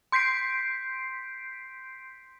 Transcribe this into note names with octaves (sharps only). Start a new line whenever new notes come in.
C6 G6 B6 C7 D7